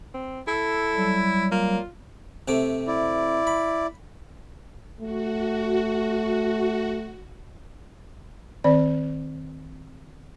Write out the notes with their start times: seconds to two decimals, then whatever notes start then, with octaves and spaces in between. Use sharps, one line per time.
0.14 C4
0.48 E4 A4
0.95 F#3 G3
1.52 A#3 F4
2.48 C3 A3 D6
2.87 E4 D5
3.47 B5
5.01 A3 F#4
8.64 D#3 C4 D5